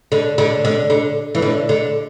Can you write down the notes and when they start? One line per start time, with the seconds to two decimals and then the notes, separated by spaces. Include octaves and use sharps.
0.12 D3
0.38 D3
0.65 D3
0.90 D3
1.35 E3
1.42 D3
1.69 D3